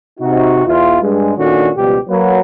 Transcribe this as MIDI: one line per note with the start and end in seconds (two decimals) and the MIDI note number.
0.20 0.65 48
0.20 0.65 63
0.20 0.65 66
0.66 0.99 40
0.66 0.99 64
0.66 0.99 65
1.02 1.32 43
1.02 1.32 56
1.36 1.70 46
1.36 1.70 51
1.36 1.70 61
1.36 1.70 62
1.36 1.70 66
1.36 1.70 69
1.76 1.96 37
1.76 1.96 47
1.76 1.96 53
1.76 1.96 55
1.76 1.96 67
2.09 2.40 54
2.09 2.40 58
2.09 2.40 71